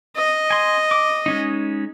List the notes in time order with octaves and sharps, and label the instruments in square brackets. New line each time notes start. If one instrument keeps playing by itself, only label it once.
[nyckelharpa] D#5
[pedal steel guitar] G#5 C6
D6
G#3 C#4 D#4